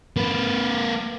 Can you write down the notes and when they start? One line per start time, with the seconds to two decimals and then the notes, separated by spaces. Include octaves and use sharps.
0.17 A#3 B4